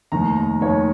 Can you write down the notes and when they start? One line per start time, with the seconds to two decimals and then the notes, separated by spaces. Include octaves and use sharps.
0.12 F1 D#2 D#3 A#5
0.36 A#5
0.61 F1 D#2 D#3 C#5